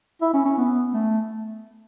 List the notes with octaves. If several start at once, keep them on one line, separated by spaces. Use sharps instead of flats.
E4
C#4
C#4
B3
A3